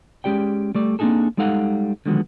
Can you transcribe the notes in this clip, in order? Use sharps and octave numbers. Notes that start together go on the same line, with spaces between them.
G#3 C#4 G4 D5 G5
G3 A3 D5
A#3 C4 D4 D#4 G#4 A4
G3 G#3 D#4 A4 F5 F#5
D3 D#3 F3 F#3 G#3 B3